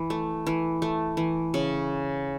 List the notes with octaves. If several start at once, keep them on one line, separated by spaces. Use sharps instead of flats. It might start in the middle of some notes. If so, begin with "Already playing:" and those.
Already playing: E3
A3
E3
A3
E3
C#3